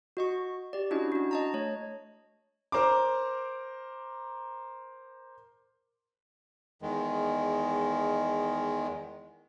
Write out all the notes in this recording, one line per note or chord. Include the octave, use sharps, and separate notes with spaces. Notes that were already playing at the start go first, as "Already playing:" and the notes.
F#4 D#5 C#6
G4 D5
C#4 D4 E4 F#4 D#5
D4 F#4
D#5 A5 A#5
A3 C#5
A#4 C5 A#5 C6 D6
E2 D#3 G#3